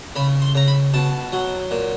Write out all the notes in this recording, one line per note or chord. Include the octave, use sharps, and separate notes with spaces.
C#3 B5
C6
C#3 A#5
B5
B2 A5
F#3
A#2